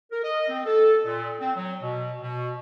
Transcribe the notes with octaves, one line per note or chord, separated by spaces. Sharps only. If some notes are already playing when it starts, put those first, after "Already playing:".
A#4
D#5
C4
A4
A#2
C4
F#3
B2
B2